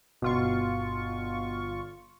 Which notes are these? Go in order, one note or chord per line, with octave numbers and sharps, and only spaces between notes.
G1 B2 F4 C#6